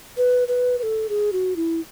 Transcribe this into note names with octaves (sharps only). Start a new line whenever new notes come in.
B4
B4
B4
A4
G#4
F#4
E4